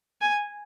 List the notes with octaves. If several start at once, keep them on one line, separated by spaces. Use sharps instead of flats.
G#5